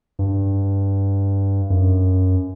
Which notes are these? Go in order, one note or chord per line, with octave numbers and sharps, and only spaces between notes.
G2
F#2